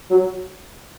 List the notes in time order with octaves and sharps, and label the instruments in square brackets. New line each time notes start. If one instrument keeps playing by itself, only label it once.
[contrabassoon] F#3